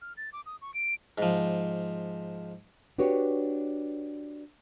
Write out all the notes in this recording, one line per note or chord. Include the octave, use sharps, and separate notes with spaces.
F6
A6
D6
D#6
C#6
D7
G#2 F3
D4 F#4 G4 B4 C#5